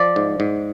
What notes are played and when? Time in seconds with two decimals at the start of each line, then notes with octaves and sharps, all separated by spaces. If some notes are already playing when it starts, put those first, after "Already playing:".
Already playing: F3 D5
0.16 G#2
0.40 G#2